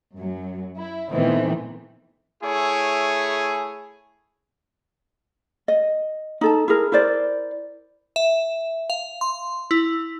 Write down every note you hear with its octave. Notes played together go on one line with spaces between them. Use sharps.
F#2 F#3
E4
A#2 D#3 E3 A3 B3 C4
A3 E4 G#4 C#5
D#5
D#4 A4 A5
E4 G#4 A#4
E4 A#4 C5 D5
E5
F5
C6
E4